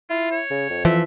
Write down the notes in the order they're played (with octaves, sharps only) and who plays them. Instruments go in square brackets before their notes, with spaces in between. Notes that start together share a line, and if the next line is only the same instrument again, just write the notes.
[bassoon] E4 [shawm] F4
[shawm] C#5
[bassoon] C#3
F2
[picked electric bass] E3 F3 [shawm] E5